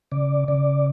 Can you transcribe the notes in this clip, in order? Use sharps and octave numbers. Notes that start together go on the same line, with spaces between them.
C#3 D5
C#3 D5